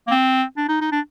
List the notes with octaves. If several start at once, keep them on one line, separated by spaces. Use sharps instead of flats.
A#3
C4
D4
D#4
D#4
D4